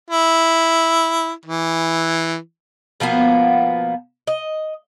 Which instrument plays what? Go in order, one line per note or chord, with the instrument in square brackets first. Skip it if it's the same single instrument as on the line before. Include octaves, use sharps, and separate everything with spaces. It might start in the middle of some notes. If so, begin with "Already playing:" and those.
[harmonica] E4
E3
[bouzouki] B2 F3 A#3 B3
D#5